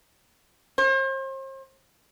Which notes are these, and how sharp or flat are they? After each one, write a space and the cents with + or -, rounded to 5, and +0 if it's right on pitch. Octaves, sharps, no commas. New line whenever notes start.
C5 +40